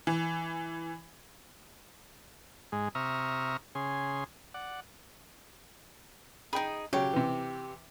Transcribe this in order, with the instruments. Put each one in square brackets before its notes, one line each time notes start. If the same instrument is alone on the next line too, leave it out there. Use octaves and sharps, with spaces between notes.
[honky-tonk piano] E3
[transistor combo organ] G#2 G#3
C3 E5 A#5 C#6 D#6 F6
C#3 G#4 C6
D5 F#5
[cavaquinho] D#4 G#4 [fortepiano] G5 B5
[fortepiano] C#3 F#3 C#5 [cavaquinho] G4
[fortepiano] C3 E3